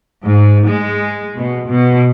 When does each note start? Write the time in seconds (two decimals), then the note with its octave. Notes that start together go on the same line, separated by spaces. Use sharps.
0.24 G#2
0.66 G#3
1.36 B2
1.70 B2